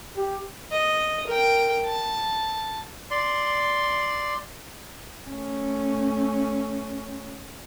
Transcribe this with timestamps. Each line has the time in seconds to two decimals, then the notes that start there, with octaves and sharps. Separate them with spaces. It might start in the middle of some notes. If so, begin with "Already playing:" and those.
0.17 G4
0.72 D#5
1.27 A#4 G5
1.86 A5
3.11 D5 C6
5.30 A3 C#4